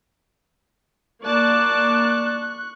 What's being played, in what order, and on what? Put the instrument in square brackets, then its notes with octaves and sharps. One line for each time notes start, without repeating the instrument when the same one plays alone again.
[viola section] A#3 D5 A5 [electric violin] C#6 F#6